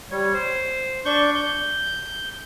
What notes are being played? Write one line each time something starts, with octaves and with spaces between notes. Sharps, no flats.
G3 C#5
C5
D4 C#6 G6
G6